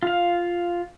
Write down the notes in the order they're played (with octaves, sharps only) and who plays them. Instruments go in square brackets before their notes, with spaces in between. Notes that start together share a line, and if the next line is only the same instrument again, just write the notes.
[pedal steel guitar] F4 F5